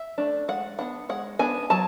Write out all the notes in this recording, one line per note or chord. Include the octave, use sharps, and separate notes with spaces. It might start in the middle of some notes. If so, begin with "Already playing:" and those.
Already playing: E5
A3 D4
G#3 F#5
B3 D4 F#5
G#3 F#5
B3 D4 G#5
F#3 A5